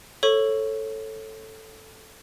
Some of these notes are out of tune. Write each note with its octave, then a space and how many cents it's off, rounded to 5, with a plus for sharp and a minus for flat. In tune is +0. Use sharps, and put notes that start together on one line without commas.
A4 +0 C#5 -20 C#6 +0